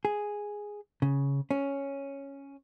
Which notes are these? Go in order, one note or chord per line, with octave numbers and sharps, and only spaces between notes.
G#4
C#3
C#4